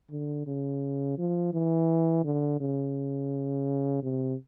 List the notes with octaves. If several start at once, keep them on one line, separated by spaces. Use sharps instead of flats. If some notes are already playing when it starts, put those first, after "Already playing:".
D3
C#3
F3
E3
D3
C#3
C3